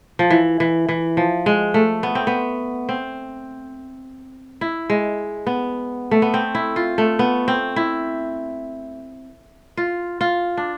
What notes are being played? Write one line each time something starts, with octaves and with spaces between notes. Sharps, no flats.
F3
E3
E3
E3
F3
G#3
A3
B3
C4
B3
C4
E4
G#3
B3
A3
B3
C4
E4
F4
A3
B3
C4
E4
F4
F4
D4